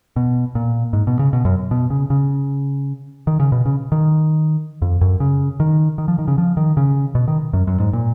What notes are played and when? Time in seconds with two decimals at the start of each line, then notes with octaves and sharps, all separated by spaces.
0.16 B2
0.55 A#2
0.93 G#2
1.07 B2
1.19 C#3
1.33 B2
1.45 F#2
1.71 B2
1.90 C#3
2.10 C#3
3.27 D#3
3.40 C#3
3.52 B2
3.65 C#3
3.92 D#3
4.82 F2
5.01 F#2
5.20 C#3
5.60 D#3
5.98 D#3
6.08 F3
6.18 D#3
6.28 C#3
6.38 F3
6.57 D#3
6.77 C#3
7.15 B2
7.28 D#3
7.53 F#2
7.67 F#2
7.80 G#2
7.93 A#2